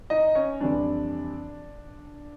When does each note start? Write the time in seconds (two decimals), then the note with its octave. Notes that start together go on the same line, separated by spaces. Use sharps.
0.10 D#4 D#5
0.35 C#4 C#5
0.60 F2 C3 E3 G3 D4 D5